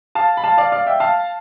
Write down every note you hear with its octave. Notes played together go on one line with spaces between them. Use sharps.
F5 A5
B5
F5 A5
D5 F5
D5 F5
E5 G5
F5 A5